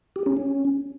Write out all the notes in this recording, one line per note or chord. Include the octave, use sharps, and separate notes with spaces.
G4
C#4
C#4